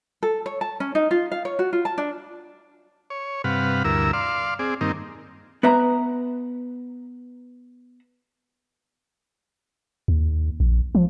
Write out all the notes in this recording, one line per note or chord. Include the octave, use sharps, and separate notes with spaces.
A4
C#5
A5
C#4
D#4
F4
F5
C#5
F#4
F4
A5
D4
C#5
G2 C3 B4 F5 F#5
D2 G2 E4 A#4 E6
D5 F5 C6
C4 G#4 D5
G2 D#3 A#3 C4 D#4
B3 B4 E5 A#5
D#2
A#1
F3